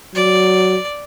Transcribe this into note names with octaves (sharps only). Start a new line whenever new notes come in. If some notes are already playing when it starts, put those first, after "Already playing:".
F#3 D5